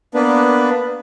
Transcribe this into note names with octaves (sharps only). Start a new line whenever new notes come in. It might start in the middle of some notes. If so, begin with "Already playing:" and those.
A#3 B3 D4 B4